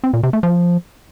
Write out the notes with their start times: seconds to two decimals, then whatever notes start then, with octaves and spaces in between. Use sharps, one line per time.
0.04 C4
0.13 A#2
0.23 C3
0.33 A3
0.43 F3